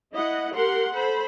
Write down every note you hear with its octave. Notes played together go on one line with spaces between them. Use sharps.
E4 D#5 F#5
G4 A#4 F#5 C6
A4 C5 B5